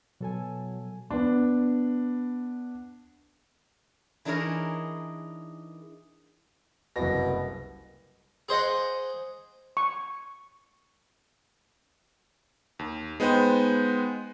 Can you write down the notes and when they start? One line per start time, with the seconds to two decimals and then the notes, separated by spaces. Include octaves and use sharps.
0.20 B2 F#3 A4 G#5
1.11 B3 D4
4.25 E3 D4 D#4 G#4 A#4 C#5
6.96 F#1 C2 B2 A#6
8.49 G#4 C5 D#5 F#5
9.77 C#6
12.79 D#2
13.20 G#3 B3 D#4 C5 G5